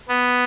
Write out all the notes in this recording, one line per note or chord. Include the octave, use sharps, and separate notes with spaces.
B3